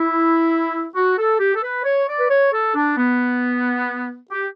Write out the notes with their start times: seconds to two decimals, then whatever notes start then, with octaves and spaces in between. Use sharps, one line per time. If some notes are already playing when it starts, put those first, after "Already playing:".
Already playing: E4
0.95 F#4
1.17 A4
1.39 G4
1.55 A4
1.62 B4
1.84 C#5
2.07 D5
2.19 B4
2.29 C#5
2.52 A4
2.74 D4
2.97 B3
4.31 G4